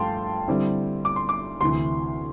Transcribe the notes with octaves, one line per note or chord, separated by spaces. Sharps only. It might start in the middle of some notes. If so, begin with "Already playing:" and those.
Already playing: G2 F3 A3 F5 G5 A5 C6
D3 G3 C4 E4
D6
C6
D6
D2 C3 E3 C6